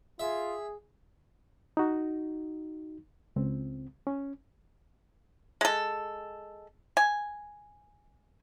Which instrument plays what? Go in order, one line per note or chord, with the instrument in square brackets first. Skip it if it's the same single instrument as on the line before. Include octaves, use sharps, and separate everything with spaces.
[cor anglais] F4 [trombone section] G#4 [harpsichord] E5
[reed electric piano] D#4 F#4
C#2 C4
C#4
[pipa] G#3 A4
G#5